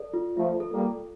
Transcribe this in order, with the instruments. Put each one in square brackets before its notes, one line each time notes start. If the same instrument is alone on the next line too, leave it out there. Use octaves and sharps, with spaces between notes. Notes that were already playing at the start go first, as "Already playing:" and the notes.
Already playing: [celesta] A4 D5
F4
[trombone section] F3 A3 [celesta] F4
[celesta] A4
[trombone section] G3 A#3
[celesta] A4